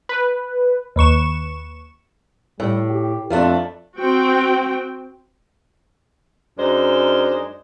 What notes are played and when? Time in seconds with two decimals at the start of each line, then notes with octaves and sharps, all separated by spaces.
0.09 B4
0.96 D#2 B4 C#6 E7
2.60 A2 G3
2.90 G4
3.30 F2 F3 A3 D4
3.98 C4 F#4 G5
6.58 F#2 G#3 D4 D#4 C5